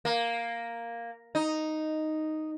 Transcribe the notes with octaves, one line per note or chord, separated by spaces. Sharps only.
A#3
D#4